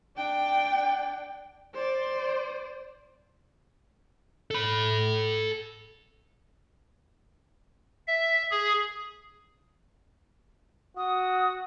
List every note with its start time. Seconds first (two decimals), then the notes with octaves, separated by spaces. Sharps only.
0.17 D4 G5
1.75 C5 D5
4.51 A4 B5
8.07 E5
8.51 G#4
10.97 F#4 D#6